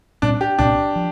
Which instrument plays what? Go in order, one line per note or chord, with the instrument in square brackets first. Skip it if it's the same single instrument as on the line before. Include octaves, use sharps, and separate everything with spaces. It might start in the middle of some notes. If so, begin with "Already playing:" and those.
[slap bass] C2 A#2 G3 C4 [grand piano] D4
[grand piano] G4
[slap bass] C2 A#2 G3 C4 [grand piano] D4
[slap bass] F3